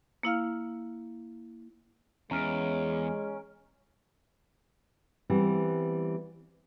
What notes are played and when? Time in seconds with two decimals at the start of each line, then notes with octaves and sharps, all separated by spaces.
0.23 A#3 E4 F5 F6
2.31 E2 G#3 C#4 A#5 F6 D7
5.29 E3 G3 B3 C4